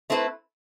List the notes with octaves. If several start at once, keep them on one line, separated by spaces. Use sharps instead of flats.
A3 C4 E4 B4